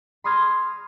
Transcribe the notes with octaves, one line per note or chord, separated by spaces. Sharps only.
B5 C6 D#6 F6 G#6 A#6